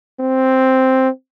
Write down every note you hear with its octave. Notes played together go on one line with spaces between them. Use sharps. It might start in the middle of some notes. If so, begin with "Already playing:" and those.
C4